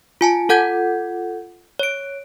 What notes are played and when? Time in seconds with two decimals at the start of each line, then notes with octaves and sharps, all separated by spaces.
0.21 F4 G#5 A5
0.49 F4 A4 F#5 G6 G#6
1.79 C#5 D7